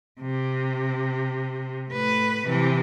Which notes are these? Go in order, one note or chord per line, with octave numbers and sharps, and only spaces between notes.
C3
A2 B4
C3 E3